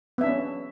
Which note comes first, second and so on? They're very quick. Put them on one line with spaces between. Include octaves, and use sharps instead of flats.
B3 E5 D4 C#4